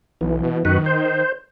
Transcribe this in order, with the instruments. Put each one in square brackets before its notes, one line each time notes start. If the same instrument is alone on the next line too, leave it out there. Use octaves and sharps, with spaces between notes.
[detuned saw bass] B1 [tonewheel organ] E3
[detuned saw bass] B2
[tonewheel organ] F#2 F#4 B4 [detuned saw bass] D#3
[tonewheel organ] C5